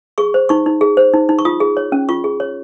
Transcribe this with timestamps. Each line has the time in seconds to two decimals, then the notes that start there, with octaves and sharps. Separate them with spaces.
0.18 G#4 C#6
0.34 C5
0.49 D#4 C#6
0.66 D#4
0.81 G#4
0.97 C5
1.14 D#4
1.29 D#4
1.39 C#6
1.45 F4 D#6
1.60 G#4
1.77 C#5
1.92 C#4
2.09 F4 C#6
2.24 G#4
2.40 C#5